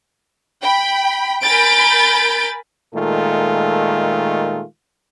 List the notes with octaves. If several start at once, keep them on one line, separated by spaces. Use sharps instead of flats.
G5 B5
A#4 G#5 B5 G6 A6 D7
A#2 D#3 G#3 A3 F4 A4